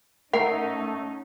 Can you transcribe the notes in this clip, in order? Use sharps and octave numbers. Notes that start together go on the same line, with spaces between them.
A3 C#4 D#4 A#4 F#5